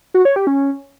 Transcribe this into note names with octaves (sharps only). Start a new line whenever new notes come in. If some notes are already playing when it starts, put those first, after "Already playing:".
F#4
C#5
G4
C#4